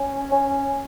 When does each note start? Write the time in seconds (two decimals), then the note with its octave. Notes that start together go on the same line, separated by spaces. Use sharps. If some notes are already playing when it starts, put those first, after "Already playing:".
Already playing: C#4
0.32 C#4